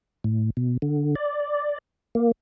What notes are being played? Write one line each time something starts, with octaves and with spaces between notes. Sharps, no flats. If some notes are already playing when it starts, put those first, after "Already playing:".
A2
B2
D3
D5
A#3